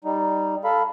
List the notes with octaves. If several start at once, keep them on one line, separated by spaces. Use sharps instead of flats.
G3 D#4
A4 F5 B5